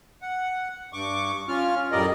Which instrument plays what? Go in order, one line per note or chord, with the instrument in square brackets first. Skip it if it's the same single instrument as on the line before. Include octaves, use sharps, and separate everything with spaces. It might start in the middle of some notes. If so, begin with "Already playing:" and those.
[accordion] F#5
G2 C#6 D6
C#4 F4 F6
F#2 A2 G3 A#4 D5 D#5